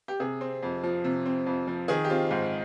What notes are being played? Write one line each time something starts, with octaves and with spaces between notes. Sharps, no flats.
G4
C3 G#4
C4
F2
F3
C3
C4
F2
F3
D#3 G#4
G4
C4 F4
G#2